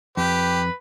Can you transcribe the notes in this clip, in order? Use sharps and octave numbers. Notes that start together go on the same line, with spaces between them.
F2 G4 B4